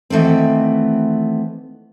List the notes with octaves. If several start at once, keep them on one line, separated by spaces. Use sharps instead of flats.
D#3 E3 A3 B3 C4